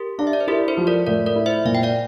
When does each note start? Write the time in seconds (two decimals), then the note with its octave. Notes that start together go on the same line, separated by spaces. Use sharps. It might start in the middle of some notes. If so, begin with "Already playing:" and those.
Already playing: G4 A#4
0.18 D4 F5
0.27 E5
0.33 D5
0.41 C5
0.47 E4 G4 A#4
0.68 A4 C5
0.77 F3
0.87 A#4 D5
1.07 A2 A#4 D5
1.26 A#4 D5
1.36 E4
1.46 C5 E5
1.65 A#2 F5
1.75 G5
1.83 D5 F5